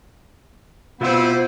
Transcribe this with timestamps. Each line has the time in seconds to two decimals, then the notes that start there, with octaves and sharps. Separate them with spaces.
1.01 B2 G3 B3 C4 E4 F4 C5 E6